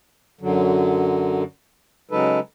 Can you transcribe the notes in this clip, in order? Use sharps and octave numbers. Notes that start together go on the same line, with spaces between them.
F#2 D3 F#3
C#3 F#3 G#3 D#4 A4 B4